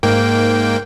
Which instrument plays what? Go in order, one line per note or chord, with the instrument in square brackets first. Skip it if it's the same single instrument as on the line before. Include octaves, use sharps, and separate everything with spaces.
[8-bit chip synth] G#2 A#3 G5